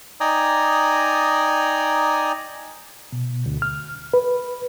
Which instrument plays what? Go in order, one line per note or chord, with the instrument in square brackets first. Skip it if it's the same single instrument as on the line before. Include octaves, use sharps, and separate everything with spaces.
[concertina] D#4 D5 G5 G#5 A#5 D#6
[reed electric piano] B2
D2
F6
B4